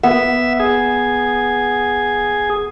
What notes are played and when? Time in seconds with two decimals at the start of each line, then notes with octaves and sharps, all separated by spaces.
0.03 B3 E5
0.60 G#4